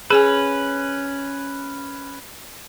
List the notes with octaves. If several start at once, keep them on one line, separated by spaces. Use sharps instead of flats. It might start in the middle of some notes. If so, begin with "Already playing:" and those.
C#4 G#4 B4 G#5